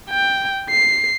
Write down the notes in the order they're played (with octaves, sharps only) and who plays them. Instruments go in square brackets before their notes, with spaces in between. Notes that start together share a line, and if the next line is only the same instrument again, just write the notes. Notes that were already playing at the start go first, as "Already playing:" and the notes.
[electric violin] G5
C7